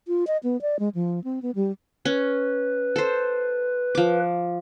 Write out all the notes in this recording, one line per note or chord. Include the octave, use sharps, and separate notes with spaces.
F4
D#5
B3
D5
G#3
F3
C4
B3
G3
C#4 B4
A4 C5
F3 D6